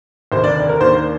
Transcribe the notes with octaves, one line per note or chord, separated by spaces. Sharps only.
F1 D#2 D3 C5
D5
A#4
D#2 D#3 A#3 D4 C5